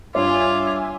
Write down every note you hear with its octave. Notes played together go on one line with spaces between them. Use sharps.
G2 F4 C#5 E5 G#5 D6